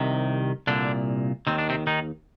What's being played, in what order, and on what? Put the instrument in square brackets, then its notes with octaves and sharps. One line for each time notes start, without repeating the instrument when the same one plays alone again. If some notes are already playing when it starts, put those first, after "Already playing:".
Already playing: [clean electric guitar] C2 C3 D#3
C2 A#2 D3 D4
D#2 D#3 C4
D4
C3 C4
D#3 D#4